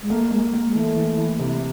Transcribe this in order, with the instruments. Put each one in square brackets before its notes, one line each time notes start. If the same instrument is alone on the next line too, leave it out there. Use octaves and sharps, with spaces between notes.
[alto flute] G#3
[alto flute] A3 [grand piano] A#3
[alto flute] G#3 [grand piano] A#3
[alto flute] A3 [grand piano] A#3
[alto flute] G#3
[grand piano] E3 [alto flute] A3
[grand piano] E3
E3
C3